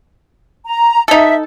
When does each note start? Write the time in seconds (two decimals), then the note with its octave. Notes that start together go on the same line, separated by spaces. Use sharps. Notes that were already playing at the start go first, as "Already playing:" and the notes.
0.65 A#5
1.08 D#4 A4 E5